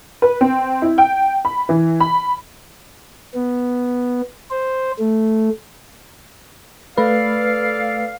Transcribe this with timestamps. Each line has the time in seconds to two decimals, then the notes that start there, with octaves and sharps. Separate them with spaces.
0.22 B4
0.41 C4
0.82 E4
0.98 G5
1.45 B5
1.69 E3
2.00 B5
3.35 B3
4.51 C5
4.99 A3
6.97 A3 A4 B4 D5 F5